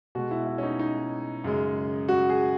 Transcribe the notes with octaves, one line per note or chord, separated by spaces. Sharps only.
B2 G#3 F#4
E4
E4
C#4
D#4
D#4
F#2 C#3 G#3
F#4
G#4